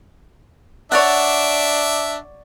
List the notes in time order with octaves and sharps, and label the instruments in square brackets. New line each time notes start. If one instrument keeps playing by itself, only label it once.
[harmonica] D4 E5 [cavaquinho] C#5 D5 F#5